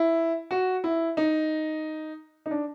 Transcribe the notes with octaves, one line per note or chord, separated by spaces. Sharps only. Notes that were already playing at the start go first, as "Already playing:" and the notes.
Already playing: E4
F#4
E4
D#4
D#4
D4